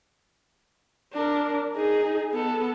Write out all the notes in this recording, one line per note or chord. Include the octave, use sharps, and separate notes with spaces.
D4 A#4
D#4 G#4
B3 A4